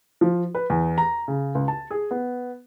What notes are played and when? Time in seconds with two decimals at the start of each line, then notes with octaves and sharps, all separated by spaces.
0.21 F3
0.55 B4
0.70 E2
0.98 A#5
1.28 C#3
1.55 C#2
1.68 A5
1.91 G#4
2.11 B3